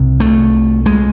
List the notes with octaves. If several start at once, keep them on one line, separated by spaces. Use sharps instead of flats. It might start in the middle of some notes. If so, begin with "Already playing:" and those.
Already playing: C2 C3
A3
G#3